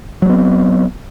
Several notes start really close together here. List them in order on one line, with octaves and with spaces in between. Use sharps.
F#3 G#3 B3 C4